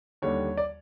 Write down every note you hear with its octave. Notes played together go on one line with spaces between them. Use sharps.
D#2 D3 G3 C#5
D5